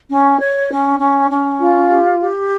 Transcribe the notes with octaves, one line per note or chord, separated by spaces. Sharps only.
C#4
C#5
C#4
C#4
C#4
F4
G4
G4